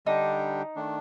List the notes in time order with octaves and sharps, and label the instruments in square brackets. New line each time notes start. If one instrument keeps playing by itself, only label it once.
[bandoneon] D3 G3 D4 G4 [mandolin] D#4
[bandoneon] D#3 A3 D4